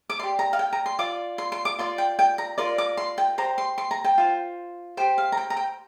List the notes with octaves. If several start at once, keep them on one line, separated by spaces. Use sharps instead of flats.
D6
G4 D5 C6
A#5
F5
G5
A#5
C6
F4 D5 D6
C6
C6
D6
F4 D5 C6
G5
G5
A#5
F4 A#4 D5 C6
D6
C6
G5
G4 C5 A#5
C6
C6
A#5
G5
F4 C5
G4 C5 G5
F5
A#5
G5
A#5
G5